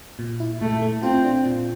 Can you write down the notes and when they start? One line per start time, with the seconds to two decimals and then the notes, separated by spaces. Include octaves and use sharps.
0.19 A#2
0.40 E4
0.61 A#2 A3
0.82 A3
1.03 C4 F4
1.24 D4
1.45 A#2